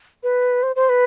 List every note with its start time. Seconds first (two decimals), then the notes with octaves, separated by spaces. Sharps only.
0.23 B4
0.63 C5
0.76 C5
0.89 B4